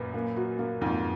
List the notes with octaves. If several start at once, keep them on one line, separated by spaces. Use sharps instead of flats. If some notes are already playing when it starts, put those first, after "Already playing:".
Already playing: F#2 A#2 B4
A#3
F#4
A#3
F2 G#2 A#3